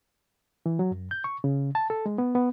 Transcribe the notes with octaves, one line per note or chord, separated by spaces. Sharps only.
E3
F#3
F#2
G6
C#6
C#3
A5
A4
G#3
B3
B3